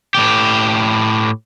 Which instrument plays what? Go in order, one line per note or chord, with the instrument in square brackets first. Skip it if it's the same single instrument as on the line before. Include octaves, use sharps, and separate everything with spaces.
[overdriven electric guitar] A2 G4